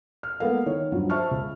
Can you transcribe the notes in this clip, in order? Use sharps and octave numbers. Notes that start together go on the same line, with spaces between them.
F6
G#3 A#3 B3 A4 A#4 F5
D#3 C#5
G2 F3 F#3
C5 E5 A5 C#6 F6
C#2